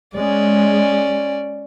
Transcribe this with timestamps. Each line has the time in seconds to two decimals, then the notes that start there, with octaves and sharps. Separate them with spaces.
0.15 G#3 C#4 D5